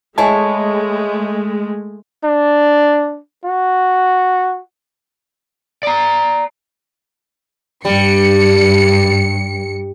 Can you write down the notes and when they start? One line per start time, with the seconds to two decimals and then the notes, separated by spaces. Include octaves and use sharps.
0.18 G#3 A3 E4 G#4 C#5 D#5 A5 C#6
2.25 D4
3.45 F#4
5.83 D5 A#5
7.85 G2 G3 C#7